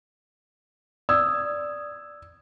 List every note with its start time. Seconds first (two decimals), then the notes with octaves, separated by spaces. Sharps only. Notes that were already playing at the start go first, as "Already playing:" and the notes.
1.09 D5 D#6 E6 G#6